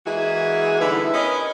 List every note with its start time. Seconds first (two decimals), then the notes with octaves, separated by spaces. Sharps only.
0.06 E3 G#3 A#3 E4 F#4 G#4
0.80 D3 E3 G3 B3 D#4 E4
1.14 C#4 A#4 B4 D#5